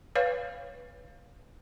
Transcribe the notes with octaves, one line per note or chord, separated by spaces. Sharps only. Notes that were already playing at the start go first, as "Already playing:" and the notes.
B4 C#5 F5